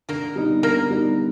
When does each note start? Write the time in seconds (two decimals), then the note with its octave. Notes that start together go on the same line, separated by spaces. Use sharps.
0.09 D3 A#3 A#4
0.36 G3 B3 D#4
0.63 D3 A#3 A#4
0.90 G3 B3 D#4